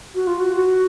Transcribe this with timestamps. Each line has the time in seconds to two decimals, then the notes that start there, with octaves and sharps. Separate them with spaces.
0.15 F#4
0.27 F4
0.40 F#4
0.56 F#4